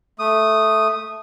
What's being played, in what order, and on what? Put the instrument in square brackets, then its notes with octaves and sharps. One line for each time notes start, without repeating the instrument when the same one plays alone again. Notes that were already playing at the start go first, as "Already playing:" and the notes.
[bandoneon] A3 D#6